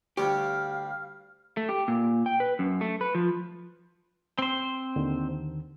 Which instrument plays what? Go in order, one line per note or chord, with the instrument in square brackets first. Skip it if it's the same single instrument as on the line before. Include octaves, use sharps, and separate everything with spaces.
[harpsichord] D2 G3 C#6 [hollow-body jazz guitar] G4 [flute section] F5 F6
[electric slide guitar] A3
G4
A#2
G5
B4
F#2
A3
B4
F3
[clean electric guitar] C4 C5
[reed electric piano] D#2 D3 D#3